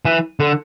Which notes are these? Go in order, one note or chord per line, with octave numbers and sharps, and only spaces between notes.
E3
D3